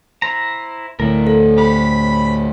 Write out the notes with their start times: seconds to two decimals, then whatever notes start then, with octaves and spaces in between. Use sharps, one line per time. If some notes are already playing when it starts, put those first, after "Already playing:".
0.22 E4 C5 A#5
1.00 D2 A2 E4 A#4
1.26 A4 C5
1.58 G4 C5 B5